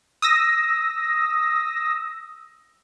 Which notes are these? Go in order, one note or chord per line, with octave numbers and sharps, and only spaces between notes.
D#6 E6 A#6